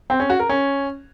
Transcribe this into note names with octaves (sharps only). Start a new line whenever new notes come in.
C4
C#4
F#4
A#4
C#4